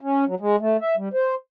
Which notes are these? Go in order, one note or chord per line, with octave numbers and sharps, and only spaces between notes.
C#4
F#3
G#3
A3
E5
G3
C5